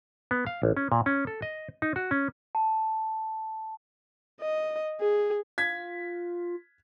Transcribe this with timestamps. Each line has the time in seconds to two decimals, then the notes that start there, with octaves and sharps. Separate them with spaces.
0.31 B3
0.47 F5
0.63 A1
0.77 C#4
0.92 A#2
1.06 C#4
1.27 A4
1.42 D#5
1.82 D#4
1.96 F#4
2.11 C#4
2.55 A5
4.42 D#5
5.01 G#4
5.58 F4 G#6 B6